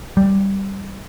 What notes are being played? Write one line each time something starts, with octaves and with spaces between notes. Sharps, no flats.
G3